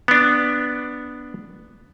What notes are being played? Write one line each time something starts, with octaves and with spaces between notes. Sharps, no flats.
B3 D4